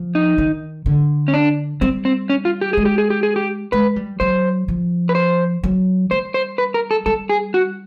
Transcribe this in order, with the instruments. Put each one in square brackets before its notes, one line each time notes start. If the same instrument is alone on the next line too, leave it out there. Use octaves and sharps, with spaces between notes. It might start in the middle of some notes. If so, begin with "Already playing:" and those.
Already playing: [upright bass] F3
[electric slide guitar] D#4
[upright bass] D#3
D3
[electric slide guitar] C#4
D4
[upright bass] G3 [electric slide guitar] C4
[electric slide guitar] C4
C#4
F4
G4
[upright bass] G#3 [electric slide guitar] G#4
[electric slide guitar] G4
G#4
G4
G#4
G4
[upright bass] G#3 [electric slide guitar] B4
[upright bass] G3
[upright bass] F#3 [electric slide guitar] C5
[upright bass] F3
[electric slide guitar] B4
C5
[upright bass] F#3
[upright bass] G3 [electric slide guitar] C5
[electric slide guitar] C5
B4
A#4
A4
[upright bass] G3 [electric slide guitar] A4
[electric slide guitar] G#4
F#4